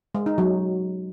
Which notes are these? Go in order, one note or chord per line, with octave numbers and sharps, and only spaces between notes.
G#3
D#4
F#3